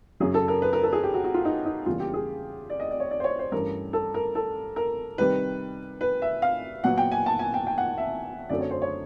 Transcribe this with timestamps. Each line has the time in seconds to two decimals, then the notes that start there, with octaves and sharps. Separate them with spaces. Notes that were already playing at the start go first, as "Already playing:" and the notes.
0.20 F#2 C#3 F#3 G#4
0.34 A4
0.48 A#4
0.62 B4
0.73 A#4
0.83 A4
0.93 G#4
1.03 G4
1.14 F#4
1.24 F#4
1.34 F4
1.45 D#4
1.66 D#4
1.86 E2 C#3 E3 G3 A#3 F4
2.00 G4
2.14 G#4
2.70 D5
2.80 D#5
2.91 D5
3.00 C#5
3.11 D5
3.20 C5
3.24 C#5
3.39 C5
3.52 G2 E3 A3 C#4 A#4
3.93 A4
4.14 A#4
4.35 A4
4.76 A#4
5.18 C3 D#3 G3 B4
6.01 B4
6.22 E5
6.42 F5
6.84 A#2 F#3 B3 F#5
6.98 G5
7.12 G#5
7.26 A5
7.39 G#5
7.54 G5
7.67 G5
7.78 F#5
7.98 E5
8.50 F#2 D3 F#3 A3 C4 D5
8.61 C#5
8.71 C5
8.82 C#5